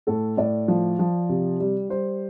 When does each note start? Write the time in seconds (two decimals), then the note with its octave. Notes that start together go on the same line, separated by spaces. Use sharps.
0.07 A2 A4
0.37 A2 D5
0.68 F3
0.99 F3
1.29 C3
1.60 G3
1.90 G3 C5